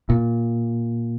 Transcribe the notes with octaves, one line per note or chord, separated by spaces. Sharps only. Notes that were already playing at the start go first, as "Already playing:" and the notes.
A#2